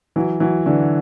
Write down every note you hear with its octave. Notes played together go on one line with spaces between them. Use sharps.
E3 F#3
E3 F#3
D3 E3